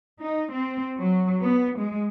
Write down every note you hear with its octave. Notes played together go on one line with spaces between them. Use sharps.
D#4
C4
F#3
B3
G#3